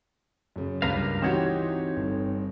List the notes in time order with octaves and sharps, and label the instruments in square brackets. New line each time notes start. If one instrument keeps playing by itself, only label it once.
[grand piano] F#2 C#3
[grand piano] C#2 G2 [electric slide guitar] A#4 B4 F5
[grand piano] E3 F#4 G4 [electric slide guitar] C4 D#4 C#5
[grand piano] G1